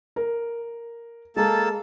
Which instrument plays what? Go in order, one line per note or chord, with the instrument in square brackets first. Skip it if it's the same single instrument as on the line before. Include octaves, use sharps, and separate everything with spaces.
[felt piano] A#4
[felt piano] G#3 [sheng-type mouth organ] A#3 A4 A5